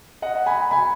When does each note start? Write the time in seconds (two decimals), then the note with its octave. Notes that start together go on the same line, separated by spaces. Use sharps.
0.22 D#5 F#5
0.46 G#5 B5
0.71 G#5 B5